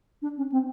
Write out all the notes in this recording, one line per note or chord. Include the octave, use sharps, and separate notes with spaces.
D4
C#4
C4